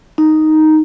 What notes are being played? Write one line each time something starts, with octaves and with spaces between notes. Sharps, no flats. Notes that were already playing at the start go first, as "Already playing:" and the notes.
D#4